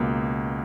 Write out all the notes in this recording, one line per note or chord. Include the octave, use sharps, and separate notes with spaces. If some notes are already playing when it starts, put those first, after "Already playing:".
Already playing: C#2 B2 A#3